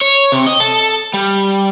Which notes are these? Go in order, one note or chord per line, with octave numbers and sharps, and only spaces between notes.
C#5
C3
D#5
A4
G3